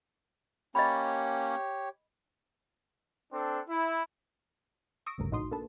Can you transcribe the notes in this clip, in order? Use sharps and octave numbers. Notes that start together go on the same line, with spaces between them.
A#3 C#4 G4 C#5 D#5 B5
C4 D4 A4
E4
C#6 D#6 E6 A#6 D7
G#1 D2 G2 C#3 A#4
A#1 A2 D#4 F#4 C6 D#6
A#3 D4 A4 B4 A5